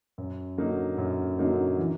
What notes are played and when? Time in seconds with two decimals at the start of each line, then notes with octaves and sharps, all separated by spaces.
0.18 F#2
0.58 D3 F#3 A#3 D#4
0.98 F#2
1.39 D3 F#3 A#3 D#4
1.79 E3